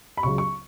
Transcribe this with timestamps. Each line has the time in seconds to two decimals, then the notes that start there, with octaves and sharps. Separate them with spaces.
0.17 B5
0.23 C#2 C#3 F#3 C#6
0.38 C#6